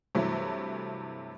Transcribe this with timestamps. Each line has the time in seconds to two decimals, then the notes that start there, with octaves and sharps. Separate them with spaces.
0.15 G2 C3 E3 F#3 A3